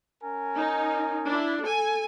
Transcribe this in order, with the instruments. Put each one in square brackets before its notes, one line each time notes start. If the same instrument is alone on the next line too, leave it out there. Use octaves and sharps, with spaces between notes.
[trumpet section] C#4 A#4 G#5
[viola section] D#4
D4 E4
A4 G#5